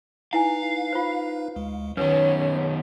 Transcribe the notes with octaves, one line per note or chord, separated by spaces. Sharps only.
D#4 E4 B4 F5 G#5
F4 C5
D2 G#3
F#2 D#3 C#4 B4 C#5